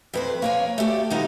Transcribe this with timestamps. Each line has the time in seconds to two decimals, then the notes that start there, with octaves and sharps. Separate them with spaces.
0.14 F2 B4 C5
0.42 A#3 C#5 G#5
0.78 A3 G4 D5
1.10 D#3 G3 B3 D#4 F4